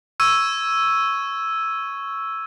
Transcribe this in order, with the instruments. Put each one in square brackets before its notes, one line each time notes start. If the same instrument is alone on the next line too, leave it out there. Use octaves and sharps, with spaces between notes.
[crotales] C#6 E6 G#6 D#7